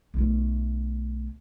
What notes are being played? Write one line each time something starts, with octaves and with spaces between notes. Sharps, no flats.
B1 A3